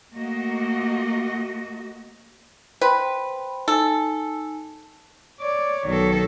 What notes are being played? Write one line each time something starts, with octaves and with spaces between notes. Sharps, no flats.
A3 A#3 F#4 D#5
B4 C5 G5 C6
D#4 A4 G#5
C#5 D5
B1 D#3 A4